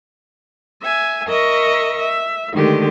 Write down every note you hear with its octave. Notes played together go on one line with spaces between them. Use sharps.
E5 G#5
A#4 D#5 E5 C#6
E5
D3 D#3 G#3 A3 G4